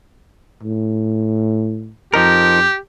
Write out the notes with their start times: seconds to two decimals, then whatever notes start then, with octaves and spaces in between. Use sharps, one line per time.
0.63 A2
2.14 F2 F3 D#4 G4 A#4